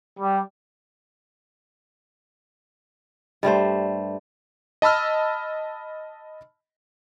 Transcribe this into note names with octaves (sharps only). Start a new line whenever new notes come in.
G3
G2 G3 A3 C5
D#5 A5 B5 E6 F6